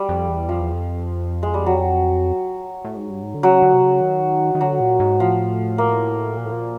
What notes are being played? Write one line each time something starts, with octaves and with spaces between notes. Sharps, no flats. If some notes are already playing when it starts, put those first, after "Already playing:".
Already playing: G3
F2
E2
F2 F3
E2
F2
G#3
G3
F#3
A2
G#2
G2
G#2
D3
C#3 F#3
D3
C3
C#3
D#3
D#3
D3 F#3
A#2
G#2
A2 F3
A#3
A#2
A2
A#2